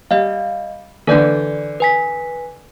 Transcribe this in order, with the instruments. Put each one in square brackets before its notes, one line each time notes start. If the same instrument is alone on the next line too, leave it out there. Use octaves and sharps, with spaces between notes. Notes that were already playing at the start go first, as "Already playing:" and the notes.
[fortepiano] G3 [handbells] D#5 F5
[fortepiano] D3 E3 [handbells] A4 D5 G6
[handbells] B4 G#5 B6